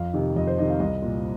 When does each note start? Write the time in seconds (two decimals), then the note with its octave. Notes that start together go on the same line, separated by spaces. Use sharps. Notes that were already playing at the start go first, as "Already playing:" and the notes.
Already playing: F2 F5
0.13 C3 D#3 D#5
0.36 F2 D#5
0.47 C5
0.58 C3 D#3 D#5
0.69 F5
0.80 C2 D#5
1.02 A#2